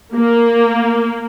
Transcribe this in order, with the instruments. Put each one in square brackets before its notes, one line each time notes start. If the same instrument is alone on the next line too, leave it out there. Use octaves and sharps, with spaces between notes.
[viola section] A#3